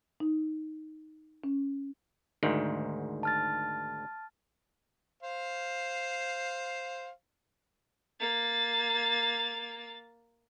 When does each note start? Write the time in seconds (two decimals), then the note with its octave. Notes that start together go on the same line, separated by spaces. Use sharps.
0.20 D#4
1.44 C#4
2.43 D2 G#2 D#3
3.23 A5 F6 A6
5.23 C5 F5
8.20 A#3 A6